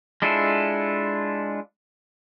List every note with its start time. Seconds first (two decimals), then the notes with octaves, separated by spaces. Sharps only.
0.22 G#3 D4 E4 F4 A4